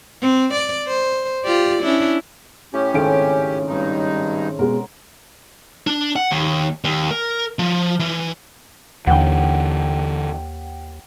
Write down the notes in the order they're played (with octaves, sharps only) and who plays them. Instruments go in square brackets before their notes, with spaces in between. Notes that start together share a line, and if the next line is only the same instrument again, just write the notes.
[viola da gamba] C4
D5
C5
F4 G4 D5
C#4 D4 E4
[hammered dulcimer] A2 A#5 [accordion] C#4 G4
[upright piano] G#1 A4 D7 [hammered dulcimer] C#3 C4
[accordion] G2 D#4
[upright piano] B2 G#3 [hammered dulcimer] A#4 F#5
[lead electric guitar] D4
F#5
D#2
D#2
A#4
F3
E3
[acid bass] D#2 [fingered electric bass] D3 E3 [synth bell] F#5 G5